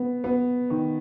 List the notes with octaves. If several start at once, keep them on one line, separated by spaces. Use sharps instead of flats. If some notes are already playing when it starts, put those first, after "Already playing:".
Already playing: B3
B3
D#3